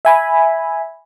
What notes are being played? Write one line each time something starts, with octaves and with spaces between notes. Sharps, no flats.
E5 G#5 B5